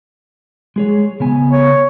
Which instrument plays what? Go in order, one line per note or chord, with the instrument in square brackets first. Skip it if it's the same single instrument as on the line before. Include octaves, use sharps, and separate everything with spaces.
[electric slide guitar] G#3 G#4 C#5
C#3 B3 G#5
[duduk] C#5